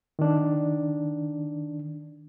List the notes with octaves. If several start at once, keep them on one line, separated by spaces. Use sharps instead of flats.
D#3 D4